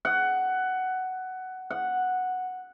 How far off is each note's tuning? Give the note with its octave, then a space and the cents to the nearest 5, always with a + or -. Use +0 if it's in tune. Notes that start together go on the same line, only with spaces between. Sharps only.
F#5 +10
F#5 -5